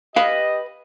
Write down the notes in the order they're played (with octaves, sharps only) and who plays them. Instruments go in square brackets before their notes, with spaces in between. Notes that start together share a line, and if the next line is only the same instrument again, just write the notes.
[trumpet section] G4 D#5 [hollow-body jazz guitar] B4 F5